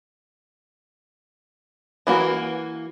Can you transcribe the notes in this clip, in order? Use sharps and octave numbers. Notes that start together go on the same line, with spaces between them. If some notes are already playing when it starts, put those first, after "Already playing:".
E3 A#3 F#4